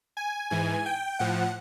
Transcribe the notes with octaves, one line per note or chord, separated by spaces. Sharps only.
G#5
G#2 E3 G#5
G5
A2 F3 F#5